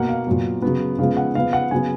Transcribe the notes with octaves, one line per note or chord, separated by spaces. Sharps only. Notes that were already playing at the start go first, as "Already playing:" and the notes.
Already playing: B2 A#3 F#5
F5
A#2 F#3 B3
C#3 F#3 B3
C#3 F3 G#3 B3 F5
F#5
C#3 F3 B3 F5
F#5
C#3 F#3 B3 G#5